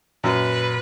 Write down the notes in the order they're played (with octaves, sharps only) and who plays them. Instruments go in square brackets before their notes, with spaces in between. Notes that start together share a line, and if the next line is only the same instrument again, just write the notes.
[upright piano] F#2 [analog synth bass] A#2 [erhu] B4